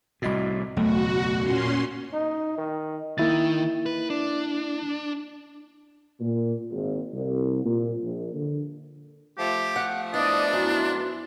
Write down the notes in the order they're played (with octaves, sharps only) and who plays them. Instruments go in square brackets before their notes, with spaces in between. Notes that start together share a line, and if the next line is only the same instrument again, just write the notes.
[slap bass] C2 A2 [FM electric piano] F#4 D#5 D6
[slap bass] F#1 B1 [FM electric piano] E2 A3 [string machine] F#4
[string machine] A#2 C#4 C6
[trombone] D#4
D#3
[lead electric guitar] D#3 [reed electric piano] A#3 E4 A6
[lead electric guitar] B4
D4
[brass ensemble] A#2
G#1
C2
A#2
A#1
D3
[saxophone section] F3 A3 [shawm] G4
[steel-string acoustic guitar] F#5
[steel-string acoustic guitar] B3 [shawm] D4 [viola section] E4 D5 D#5
[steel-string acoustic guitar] F#2 [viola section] B3 E4 C6